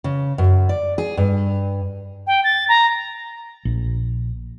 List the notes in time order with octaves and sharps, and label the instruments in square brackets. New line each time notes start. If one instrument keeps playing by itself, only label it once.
[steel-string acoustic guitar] C#3
F#2
D5
G#4
G2
[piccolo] G5
A6
A#5
[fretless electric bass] A#1